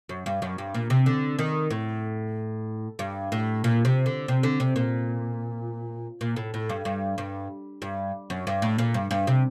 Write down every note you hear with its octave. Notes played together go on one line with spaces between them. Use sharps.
F#2
G2
F#2
G2
A#2
C3
D3
D#3
A2
G2
A2
A#2
C3
D3
C3
D3
C3
A#2
A#2
A2
A2
G2
G2
G2
G2
F#2
G2
A2
A#2
G2
G2
C3